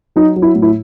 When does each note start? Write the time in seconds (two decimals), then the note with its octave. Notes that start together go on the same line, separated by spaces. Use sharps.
0.16 F#3 D#4
0.36 F#3
0.42 E4
0.55 A2
0.62 E4